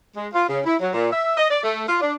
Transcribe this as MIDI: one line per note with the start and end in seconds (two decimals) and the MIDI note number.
0.16 0.28 56
0.33 0.44 65
0.49 0.61 49
0.66 0.75 64
0.80 0.90 54
0.94 1.11 46
1.12 1.34 76
1.37 1.47 75
1.50 1.61 74
1.63 1.84 57
1.89 2.00 65
2.01 2.14 62